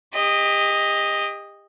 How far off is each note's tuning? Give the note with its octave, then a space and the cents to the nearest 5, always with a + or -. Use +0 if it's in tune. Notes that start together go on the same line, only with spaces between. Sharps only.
G4 +35 D#5 +0